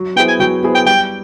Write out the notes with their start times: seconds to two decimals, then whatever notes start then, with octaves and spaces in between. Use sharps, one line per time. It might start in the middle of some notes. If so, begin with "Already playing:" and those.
Already playing: F#3
0.16 B3 E4 G#4 C5 G5
0.28 G#5
0.40 F#3 G5
0.63 B3 E4 G#4 C5
0.75 G5
0.86 G3 G5